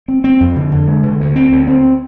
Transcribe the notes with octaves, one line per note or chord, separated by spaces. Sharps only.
C4
C4
F2
D3
D3
G#3
D3
D2
C4
D2
C4